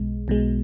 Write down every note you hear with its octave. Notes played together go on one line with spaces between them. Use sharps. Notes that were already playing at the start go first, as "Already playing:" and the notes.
Already playing: B1 B2 G#3
B1 B2 G#3